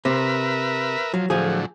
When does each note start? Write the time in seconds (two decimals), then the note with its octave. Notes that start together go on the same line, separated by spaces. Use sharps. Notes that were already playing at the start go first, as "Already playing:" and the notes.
0.05 C3 A#4 B4 E5
1.14 F3 F#3
1.30 A2 D3 F3 F#3 G#4